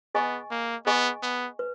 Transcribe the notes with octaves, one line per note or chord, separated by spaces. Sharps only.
B3 G#4 D#5 G#5 C#6
A#3
B3 G#4 D#5 G#5 C#6
B3
B4